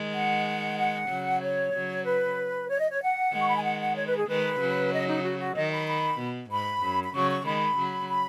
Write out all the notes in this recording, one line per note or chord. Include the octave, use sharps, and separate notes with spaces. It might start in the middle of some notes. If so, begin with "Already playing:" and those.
Already playing: D#3 G#3
F#5
F#5
C#3 F#3
C#5
C#3 F#3
B4
C#5
D#5
C#5
F#5
D#3 G#3
C#6
B5
G#5
F#5
F#5
C#5
B4
G#4
D#3 G#3 B4
C#3 F#3
D#5
D#4
F#4
F#4
D#3 D#5
B5
B5
B2
G#2 B5
F#2
B5
C#3 F#3 C#6
C#6
D#3 G#3 B5
C#3 F#3
B5